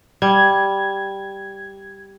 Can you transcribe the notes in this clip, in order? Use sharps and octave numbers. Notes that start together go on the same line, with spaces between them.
G3 G#6